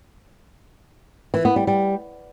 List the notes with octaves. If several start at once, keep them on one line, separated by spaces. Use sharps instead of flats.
E3
B3
G3
G3